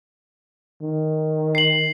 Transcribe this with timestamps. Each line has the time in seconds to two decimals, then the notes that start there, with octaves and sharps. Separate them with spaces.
0.81 D#3
1.55 C7 F#7